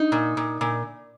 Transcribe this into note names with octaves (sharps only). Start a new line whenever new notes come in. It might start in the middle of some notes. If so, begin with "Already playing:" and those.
Already playing: D#4
A#2
A#2
A#2